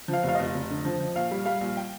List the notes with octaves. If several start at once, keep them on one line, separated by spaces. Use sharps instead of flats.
F3
F5
F1
F5
F1 D#5
F1
D3
F3
F3
A#1 F5
G3
G3 F5
A#1
G5